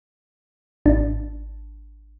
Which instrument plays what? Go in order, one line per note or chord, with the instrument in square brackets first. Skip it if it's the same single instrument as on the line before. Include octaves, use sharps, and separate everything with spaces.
[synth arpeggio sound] G#1 D4